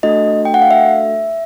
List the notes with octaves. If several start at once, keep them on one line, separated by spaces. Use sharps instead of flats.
A3 D4 F#4 A4 D#5
G5
F#5
F5
E5